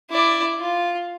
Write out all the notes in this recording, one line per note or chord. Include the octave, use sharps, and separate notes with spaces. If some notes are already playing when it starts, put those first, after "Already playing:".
E4 D5
F4